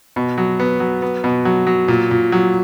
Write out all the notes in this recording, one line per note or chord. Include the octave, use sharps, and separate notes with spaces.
B2
F#3
B3
F#3
B3
B2
F#3
F#3
A#2
A#2
F#3